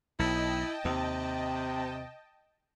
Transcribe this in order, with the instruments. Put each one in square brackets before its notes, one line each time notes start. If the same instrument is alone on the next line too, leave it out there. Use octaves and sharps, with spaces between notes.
[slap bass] B1 [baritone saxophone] E4 [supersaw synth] D#5 G5 A5
[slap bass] D#2 [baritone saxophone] C3